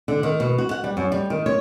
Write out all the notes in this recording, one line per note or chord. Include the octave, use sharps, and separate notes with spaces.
D3
D#3
B2
F#4
F#5
G3
F#2
G3
D#3
C#5